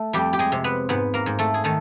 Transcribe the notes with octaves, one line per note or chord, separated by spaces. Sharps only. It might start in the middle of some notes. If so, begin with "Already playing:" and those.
Already playing: A3 A4
F2 G3 G4
G4
G#3 G#4
C3
B3 B4
G#2 B3 B4
A#3 A#4
G#2
A3 A4
G#4
D#3 A3 A4